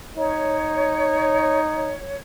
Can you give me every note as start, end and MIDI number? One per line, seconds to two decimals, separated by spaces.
0.17 1.96 63
0.17 2.20 73